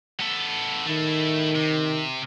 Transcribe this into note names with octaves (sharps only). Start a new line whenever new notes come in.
B3 A4
D#3 A3 E4
C3